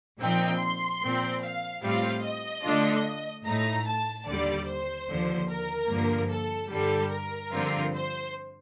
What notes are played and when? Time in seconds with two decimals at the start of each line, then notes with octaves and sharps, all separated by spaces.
0.20 A#2 F3 C4 D#4 G5
0.61 C6
1.02 A#2 F3 C4
1.43 F5
1.83 A2 G3 C4 F4 F5
2.24 D#5
2.64 D3 A3 D4 F4
3.46 A2 A3 D#4 A#5
3.86 A5
4.27 D#2 D3 G3 D5
4.68 C5
5.08 D#2 D3 F3
5.49 A#4
5.90 G2 D3 F3 A#3
6.31 A4
6.71 G2 D3 G3 A4
7.12 A#4
7.52 G2 D3 F3 C4 F4
7.93 C5